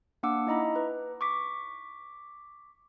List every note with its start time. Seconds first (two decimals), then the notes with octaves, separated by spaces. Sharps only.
0.23 A#3 D4 F#5 D6 E6
0.47 D#4 E4 D#5 A#5 B5
0.76 B4
1.21 C#6 D6 B6